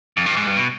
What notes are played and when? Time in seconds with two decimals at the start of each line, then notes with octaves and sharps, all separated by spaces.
0.17 F2
0.26 G2
0.37 G#2
0.47 G2
0.56 B2